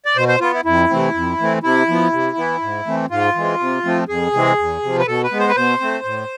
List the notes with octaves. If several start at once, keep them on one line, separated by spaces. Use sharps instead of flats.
D5
B2 C5
C5
B3 F4
E4
F2 E4
C3 E3 A3 C4
F2
E3 A3 C4
C3 E4
F3 B3
C3
E3 B3
G#2
E3 A3 C4
G#2 F4
E3 G#3 C4
C3
F3 A3 C4
F2 G#4
C3 E3 G#3 C4
E2
C3 F3
B4
B2 A4
B4
G#3 B3
C5
B4
B2 C5
A3 C4
A2